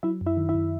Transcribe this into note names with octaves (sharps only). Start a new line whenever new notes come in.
F#3 E4 E5
F#2
E4 E5
D#3
E4 E5
F#2